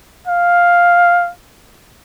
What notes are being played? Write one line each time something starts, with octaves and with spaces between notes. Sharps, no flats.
F5